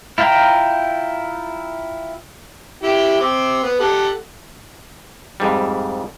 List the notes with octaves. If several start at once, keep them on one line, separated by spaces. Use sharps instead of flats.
E4 F4 E5 G5 A#5
E4 G4 G5
C4 D6
B3
G4 A4 F#5
F2 G#2 G3